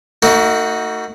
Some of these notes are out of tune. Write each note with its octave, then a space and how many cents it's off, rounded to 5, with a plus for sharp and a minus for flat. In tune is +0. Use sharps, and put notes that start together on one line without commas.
A3 +45 D#4 +20 F#4 +0